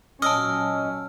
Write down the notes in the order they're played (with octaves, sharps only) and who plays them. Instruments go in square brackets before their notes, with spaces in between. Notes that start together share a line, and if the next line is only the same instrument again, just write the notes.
[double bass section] A#2 F#3 C#4 [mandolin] D#5 [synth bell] A5 E6 F6